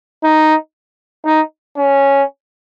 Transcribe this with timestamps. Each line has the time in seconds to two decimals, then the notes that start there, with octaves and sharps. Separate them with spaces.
0.24 D#4
1.25 D#4
1.76 C#4